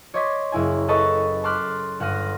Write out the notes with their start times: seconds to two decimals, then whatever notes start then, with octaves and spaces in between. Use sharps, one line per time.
0.14 C#5 D#5 C6 D6 G#6 B6
0.52 F#1 E4 G#5
0.88 A4 B4 D#5 A5 C#6 D#6
1.44 A5 C6 D6 F6 F#6 B6
2.00 G1 F#5 C6 F6 A#6 D#7